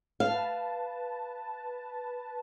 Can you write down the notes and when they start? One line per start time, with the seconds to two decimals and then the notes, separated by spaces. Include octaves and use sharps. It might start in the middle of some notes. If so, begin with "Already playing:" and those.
0.20 B4 F5 A5